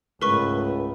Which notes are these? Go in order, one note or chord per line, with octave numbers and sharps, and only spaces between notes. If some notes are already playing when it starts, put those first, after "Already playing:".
C#2 G#2 A3 A#4 B4 C#6